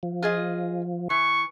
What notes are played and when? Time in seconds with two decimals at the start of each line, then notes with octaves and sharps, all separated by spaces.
0.03 F3
0.23 F4 G#4 D#5
1.10 E3 C#6